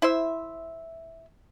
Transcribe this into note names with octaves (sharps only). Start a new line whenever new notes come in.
E4 C5 E5